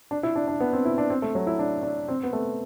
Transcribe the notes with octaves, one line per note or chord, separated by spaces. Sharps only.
D4
E4
D4
D4
B3
C4
E4
D4
C4
A3
F#3
E4
D4
D4
C4
B3
A3